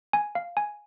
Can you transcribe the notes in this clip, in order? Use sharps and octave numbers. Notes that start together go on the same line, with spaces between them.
G#5
F5
G#5